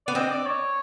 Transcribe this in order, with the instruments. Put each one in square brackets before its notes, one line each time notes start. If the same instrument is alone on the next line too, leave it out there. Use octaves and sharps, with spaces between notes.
[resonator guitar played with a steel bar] B3 [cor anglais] D5
[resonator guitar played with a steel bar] C4 [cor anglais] D#5
[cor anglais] D5
C#5